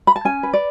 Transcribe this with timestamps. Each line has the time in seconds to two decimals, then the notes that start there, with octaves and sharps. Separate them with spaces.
0.07 B5
0.16 A5
0.25 C#4 G#5
0.43 B4
0.53 D5